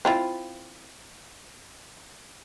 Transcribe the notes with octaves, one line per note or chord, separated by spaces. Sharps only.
C4 E4 F4